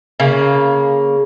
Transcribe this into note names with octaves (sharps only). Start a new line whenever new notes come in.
C#3 A#3